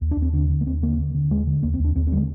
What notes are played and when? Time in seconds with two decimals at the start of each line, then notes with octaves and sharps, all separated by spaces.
0.01 D#2
0.11 D4
0.17 D#2
0.22 C4
0.33 D3 D4
0.49 D3
0.61 A#3
0.66 D#2 C4
0.83 D3 A#3
0.98 D3
1.15 D3
1.30 D#2 G#3
1.47 D3
1.63 D#2 A#3
1.74 C4
1.79 D#2
1.85 D4
1.96 D#2 C4
2.07 C4
2.12 D3 G3
2.17 G#3